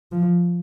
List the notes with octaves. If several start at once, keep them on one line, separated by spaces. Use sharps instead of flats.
F3